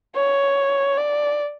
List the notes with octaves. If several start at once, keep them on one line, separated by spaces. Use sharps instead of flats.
C#5
D5